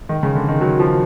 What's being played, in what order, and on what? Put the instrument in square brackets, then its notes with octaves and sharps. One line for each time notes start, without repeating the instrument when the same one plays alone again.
[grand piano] D#3
C#3
D3
D#3
F#3
F3